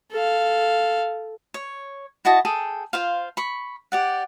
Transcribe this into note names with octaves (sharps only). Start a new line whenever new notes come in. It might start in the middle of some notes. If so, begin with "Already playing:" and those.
A4 F5
C#5
E4 F#4 D#5 A5
G#4 A4 G5
F4 C5 F5
B5 C#6
G4 D5 F#5